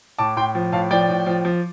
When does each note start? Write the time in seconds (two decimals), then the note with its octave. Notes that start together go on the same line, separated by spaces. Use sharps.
0.18 A2 A5 D6
0.36 A2 G5 C6
0.55 F3
0.72 A2 F5 A5
0.91 F3 D5 G5
1.08 A2
1.26 F3
1.45 F3